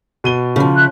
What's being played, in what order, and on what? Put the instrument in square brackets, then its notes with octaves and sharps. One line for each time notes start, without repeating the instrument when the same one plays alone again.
[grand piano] B2 D#7 G7
[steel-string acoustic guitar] C#3 F3
[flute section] E5 F#6